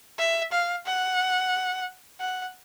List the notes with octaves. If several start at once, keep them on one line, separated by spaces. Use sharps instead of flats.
E5
F5
F#5
F#5